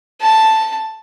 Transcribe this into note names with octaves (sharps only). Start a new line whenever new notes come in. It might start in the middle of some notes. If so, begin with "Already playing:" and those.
A5